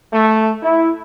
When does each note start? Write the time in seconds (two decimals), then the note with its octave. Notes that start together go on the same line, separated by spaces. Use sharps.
0.13 A3
0.62 E4